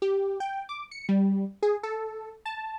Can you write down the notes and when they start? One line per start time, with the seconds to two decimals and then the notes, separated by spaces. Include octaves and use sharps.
0.02 G4
0.40 G5
0.69 D6
0.91 C#7
1.09 G3
1.63 G#4
1.83 A4
2.46 A5